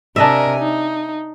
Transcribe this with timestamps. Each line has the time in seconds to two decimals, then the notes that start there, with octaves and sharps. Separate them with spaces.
0.16 C3 D4 A#4 D#5 E5 G#5
0.58 D#4